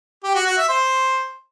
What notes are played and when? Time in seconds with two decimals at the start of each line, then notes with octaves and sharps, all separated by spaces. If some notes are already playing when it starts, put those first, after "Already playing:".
0.24 G4
0.35 F#4
0.46 F#4
0.58 E5
0.69 C5